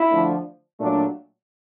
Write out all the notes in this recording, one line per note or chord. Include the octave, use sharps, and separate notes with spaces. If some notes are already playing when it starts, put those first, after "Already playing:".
Already playing: E4
D3 F3 A3 D4
A#2 F#3 A3 D4